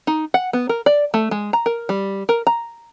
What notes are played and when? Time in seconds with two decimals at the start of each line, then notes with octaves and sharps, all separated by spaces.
0.07 D#4
0.34 F#5
0.53 B3
0.69 A#4
0.86 D5
1.14 A3
1.31 G#3
1.53 A#5
1.66 A#4
1.89 G3
2.29 A#4
2.47 A#5